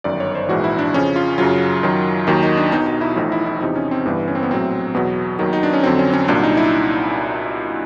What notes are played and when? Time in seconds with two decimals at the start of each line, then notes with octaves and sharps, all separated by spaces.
0.04 G1 F#2 D#3 D5
0.20 C#5
0.35 C5
0.49 A#1 G#2 E3 F#4
0.64 E4
0.79 D4
0.93 F2 C#3 F3 C#4
1.16 F4
1.38 F#2 C#3 F#3 F4
1.83 F#2 D#3 F#3
2.27 D#2 D#3 F#3 D#4
2.43 D#4
2.57 D4
2.72 B1 B2 F#3 D#4
2.87 D#4
3.01 E4
3.16 A1 A2 F3 D#4
3.32 E4
3.46 E4
3.61 E2 C3 F3 D#4
3.75 C#4
3.91 C4
4.05 G1 G2 E3 B3
4.28 C#4
4.35 C4
4.43 B3
4.49 A#1 A2 F#3 C4
4.94 E2 B2 F#3 B3
5.39 D#2 D#3 F#3
5.53 D#4
5.63 D4
5.73 C#4
5.83 F2 D3 F#3 C4
5.99 C#4
6.13 C#4
6.28 C2 A#2 F#3 D4
6.43 D#4
6.57 E4